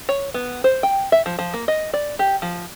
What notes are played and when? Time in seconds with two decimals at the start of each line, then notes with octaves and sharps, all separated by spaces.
0.09 C#5
0.34 B3
0.64 C5
0.83 G5
1.12 E5
1.26 F3
1.39 F3
1.54 A#3
1.68 D#5
1.94 D5
2.19 G4
2.42 F3